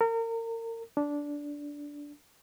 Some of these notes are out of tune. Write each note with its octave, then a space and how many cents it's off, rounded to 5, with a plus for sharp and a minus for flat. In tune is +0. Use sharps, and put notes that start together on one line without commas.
A#4 -35
D4 -10